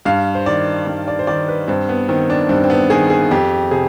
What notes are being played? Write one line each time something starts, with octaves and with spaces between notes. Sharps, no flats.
G2 F5
C5
D#3 D5
G2
D5
C5
D#3 D5
B4
G2 C4
B3
D#3 C4
D4
G2 C4
C4
B3
D#3 G#4
G#4
F2 G4
C3 G#4